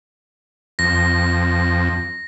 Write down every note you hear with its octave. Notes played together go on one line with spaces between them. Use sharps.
F2 A#6